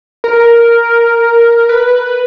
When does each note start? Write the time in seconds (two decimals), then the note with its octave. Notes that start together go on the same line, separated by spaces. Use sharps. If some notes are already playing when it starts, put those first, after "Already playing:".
0.24 A#4
1.69 B4